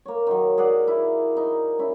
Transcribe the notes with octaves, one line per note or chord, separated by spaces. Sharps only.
A#3 C#5
D#3 F#3
G#4 A#4 D5 F#5
E4
D#4
C#4 E4